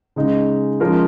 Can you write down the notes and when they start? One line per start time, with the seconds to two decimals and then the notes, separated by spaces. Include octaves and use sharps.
0.16 C#3 G#3 D#4
0.80 F3 G#3 C#4 F4 A#4